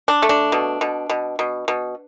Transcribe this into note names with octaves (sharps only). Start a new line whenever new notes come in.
D4
A3
D4
B2
B2
B2
B2
B2